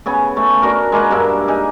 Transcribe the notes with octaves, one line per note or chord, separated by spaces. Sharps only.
C#3 B3 G#4
A3
D4 F#4 A#4
G#3 A#3 B4 F#5
G2 A#3 D4 E5
D#4 G#4